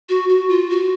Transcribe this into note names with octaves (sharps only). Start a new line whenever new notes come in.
F#4
F#4
F4
F#4